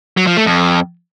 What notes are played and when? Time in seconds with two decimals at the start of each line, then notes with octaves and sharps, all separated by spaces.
0.17 F#3
0.27 F3
0.37 A3
0.46 F2